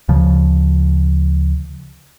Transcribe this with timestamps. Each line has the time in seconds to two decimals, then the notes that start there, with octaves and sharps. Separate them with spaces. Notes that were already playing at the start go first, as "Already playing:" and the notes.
0.08 D2 C#3 F3